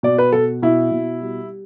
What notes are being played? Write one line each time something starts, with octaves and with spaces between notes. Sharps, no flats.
B2 D5
B4
B2 A4
B2 E4
B2
G3